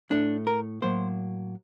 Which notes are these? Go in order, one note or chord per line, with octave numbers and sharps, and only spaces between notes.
A2 A3 D4
A#4
A2 F#3 A#3 C5